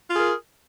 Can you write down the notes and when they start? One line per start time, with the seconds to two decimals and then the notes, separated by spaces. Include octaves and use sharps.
0.10 F4
0.13 G#4
0.17 A#4